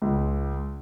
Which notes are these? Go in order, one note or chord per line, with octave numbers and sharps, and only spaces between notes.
C#2